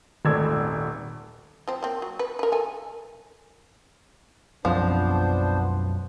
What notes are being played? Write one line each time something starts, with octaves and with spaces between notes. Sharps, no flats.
D#1 G#1 A3 D5 E6 G#6
F3 C4
A#3 C4
F#3
B4
A#4 B4
A4 G#5
B1 F#2 F3 B3 C4 D4 C5